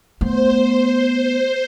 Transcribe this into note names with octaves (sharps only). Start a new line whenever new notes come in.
A3 B3 C5